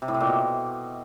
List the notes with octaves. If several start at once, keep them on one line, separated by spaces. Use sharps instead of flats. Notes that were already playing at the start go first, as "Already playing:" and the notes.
C3
A2
C3
A#2
B2